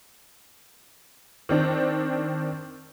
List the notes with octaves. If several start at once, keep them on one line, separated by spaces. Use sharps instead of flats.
D#3 C4 D4